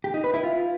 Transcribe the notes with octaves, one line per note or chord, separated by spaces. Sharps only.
G4
D#4
B4
E4
F4